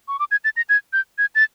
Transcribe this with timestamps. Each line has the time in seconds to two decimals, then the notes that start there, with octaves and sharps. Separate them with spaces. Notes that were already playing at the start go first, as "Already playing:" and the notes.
0.08 C#6
0.19 D6
0.31 G#6
0.44 A6
0.57 A#6
0.69 G#6
0.93 G6
1.18 G#6
1.35 A6